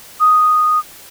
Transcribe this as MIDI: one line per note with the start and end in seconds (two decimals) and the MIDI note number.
0.20 0.79 87